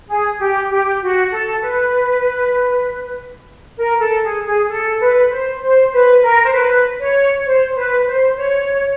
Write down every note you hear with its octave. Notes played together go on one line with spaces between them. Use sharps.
G#4
G4
G4
F#4
A4
B4
A#4
A4
G#4
G#4
A4
B4
C5
C5
B4
A#4
C5
B4
C#5
C5
B4
C5
C#5
C#5